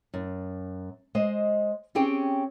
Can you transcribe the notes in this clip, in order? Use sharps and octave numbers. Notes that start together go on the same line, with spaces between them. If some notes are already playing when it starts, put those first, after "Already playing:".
F#2
G#3 C5 D#5
C4 C#4 G4 G#4 G5